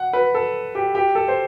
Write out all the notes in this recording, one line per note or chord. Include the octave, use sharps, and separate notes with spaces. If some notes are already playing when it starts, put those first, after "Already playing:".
Already playing: F#5
B4
A4
G4
G4
A4
C5